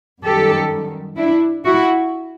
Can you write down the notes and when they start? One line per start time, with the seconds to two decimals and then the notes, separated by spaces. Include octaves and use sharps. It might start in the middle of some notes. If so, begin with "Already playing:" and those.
0.23 F#2 D#3 G3 G4 A4
1.17 D4 E4
1.65 E4 F#4